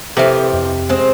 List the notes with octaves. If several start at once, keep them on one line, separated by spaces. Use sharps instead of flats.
C3 E3 F3 A4 C5 E5
F2
G#3 C4 C5